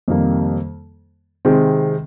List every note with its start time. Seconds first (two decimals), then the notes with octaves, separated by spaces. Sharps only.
0.08 F2 C3 D#3 G3 A#3
1.45 C3 D#3 G#3 C4